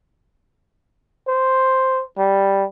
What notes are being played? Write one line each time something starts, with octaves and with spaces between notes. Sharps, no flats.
C5
G3